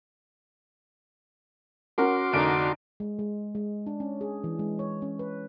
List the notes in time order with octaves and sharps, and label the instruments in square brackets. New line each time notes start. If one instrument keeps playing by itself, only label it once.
[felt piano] C#4 A#4 F#5 [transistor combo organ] F#4 C6 D6
[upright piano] F1 D3 D7 [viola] D4 D#4
[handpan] G#3
G#3
G#3
D4
C#4
G#4
E3
G#3
C#5
C#4
B4